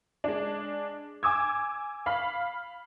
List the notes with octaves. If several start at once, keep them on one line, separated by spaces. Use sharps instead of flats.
G#3 D4
G#5 D6 E6 G#6
F5 B5 F6